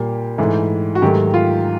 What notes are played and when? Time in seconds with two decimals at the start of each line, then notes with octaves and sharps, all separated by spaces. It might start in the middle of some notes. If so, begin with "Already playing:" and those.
Already playing: A#2 G3 A#3 G4
0.38 G#2 E3 A3
0.95 F#4
1.02 G#2 D#3 F#3 A3 G4
1.34 F4